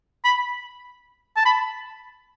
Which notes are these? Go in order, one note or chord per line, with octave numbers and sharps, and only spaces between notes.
B5
A5
B5